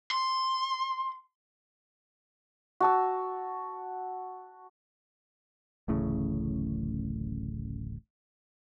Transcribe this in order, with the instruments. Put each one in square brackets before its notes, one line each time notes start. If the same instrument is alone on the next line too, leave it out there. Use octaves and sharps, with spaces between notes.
[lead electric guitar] C6
[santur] F#4 A5 E6
[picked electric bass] D1 A1 A2 C#3